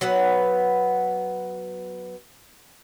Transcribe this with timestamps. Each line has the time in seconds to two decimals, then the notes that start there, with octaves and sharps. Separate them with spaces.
0.01 F#3 B3 B4 F#5